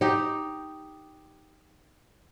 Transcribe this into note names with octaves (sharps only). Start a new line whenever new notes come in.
D#4 G4